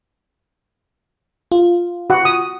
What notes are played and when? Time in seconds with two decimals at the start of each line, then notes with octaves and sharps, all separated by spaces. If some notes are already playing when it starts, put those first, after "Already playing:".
1.52 F4
2.10 F#4 F#5
2.25 D#6